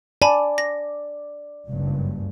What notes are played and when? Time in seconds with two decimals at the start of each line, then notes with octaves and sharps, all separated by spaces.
0.22 D5 G#5 A5 B5
0.58 A#6
1.67 F#1 C#2 G2